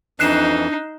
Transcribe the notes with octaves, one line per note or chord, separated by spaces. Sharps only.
F2 E3 D4 D#4 F#6 C7 E7